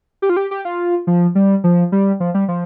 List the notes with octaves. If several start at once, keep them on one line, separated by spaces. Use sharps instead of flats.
G4
F4
G4
G4
F4
F3
G3
F3
G3
F3
G3
F3